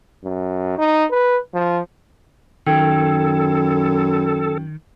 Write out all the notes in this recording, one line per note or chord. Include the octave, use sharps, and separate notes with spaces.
F#2
D#4
B4
F3
F#2 D#3 A4 G5 G#6